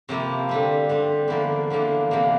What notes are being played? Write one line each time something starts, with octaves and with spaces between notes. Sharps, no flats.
C3 F3 A#3 E4
D3 G3 C4
D3 G3 C4
E2 D3 F3 A#3 E4
E2 D3 F3 A#3 E4
E2 C3 E3 A#3